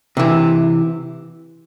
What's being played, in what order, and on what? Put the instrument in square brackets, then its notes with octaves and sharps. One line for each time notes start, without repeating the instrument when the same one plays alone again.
[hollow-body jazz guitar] C3 E3